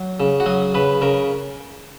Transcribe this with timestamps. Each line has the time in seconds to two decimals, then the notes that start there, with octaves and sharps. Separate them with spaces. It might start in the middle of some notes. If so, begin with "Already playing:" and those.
Already playing: F#3
0.20 C#3
0.40 F#4
0.46 F#3 G#4
0.74 C#3 B4
1.01 C#3 A#4